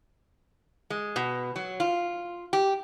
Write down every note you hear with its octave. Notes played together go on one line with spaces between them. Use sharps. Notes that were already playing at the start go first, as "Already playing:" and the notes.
G#3
B2
F#3
F4
G4